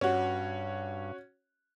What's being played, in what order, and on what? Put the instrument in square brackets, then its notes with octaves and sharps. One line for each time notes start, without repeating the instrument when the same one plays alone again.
[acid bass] G2 [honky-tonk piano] C#4 F#4